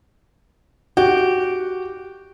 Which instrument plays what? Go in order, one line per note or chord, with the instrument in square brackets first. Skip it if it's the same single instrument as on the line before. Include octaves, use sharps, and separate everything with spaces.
[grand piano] F#4 [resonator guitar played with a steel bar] G4